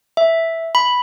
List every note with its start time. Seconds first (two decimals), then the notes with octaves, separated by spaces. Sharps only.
0.17 E5
0.75 B5